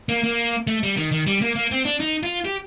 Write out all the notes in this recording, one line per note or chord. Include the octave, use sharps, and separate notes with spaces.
A#3
A#3
A3
G3
D#3
D#3
G3
A#3
A#3
C4
D4
D#4
F4
G4